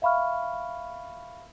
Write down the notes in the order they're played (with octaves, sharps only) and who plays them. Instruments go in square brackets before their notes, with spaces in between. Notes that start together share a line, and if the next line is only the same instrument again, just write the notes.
[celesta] E5 F5 B5 C#6 F6